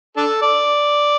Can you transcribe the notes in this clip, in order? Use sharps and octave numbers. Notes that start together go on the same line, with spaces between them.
D4 A4
D5